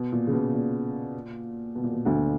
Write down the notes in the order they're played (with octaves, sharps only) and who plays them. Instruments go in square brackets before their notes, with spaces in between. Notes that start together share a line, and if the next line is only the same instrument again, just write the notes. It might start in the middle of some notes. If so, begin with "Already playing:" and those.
Already playing: [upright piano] B2
A#2
C#3
B2
A#2
B2
A#2
B2
D2 D3